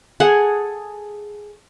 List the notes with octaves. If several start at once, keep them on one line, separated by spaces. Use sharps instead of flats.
G#4 A4 F#5